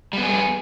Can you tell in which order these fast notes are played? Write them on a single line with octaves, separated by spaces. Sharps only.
G3 B3 G#4